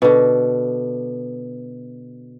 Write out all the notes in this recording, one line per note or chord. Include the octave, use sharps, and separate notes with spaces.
B2 D3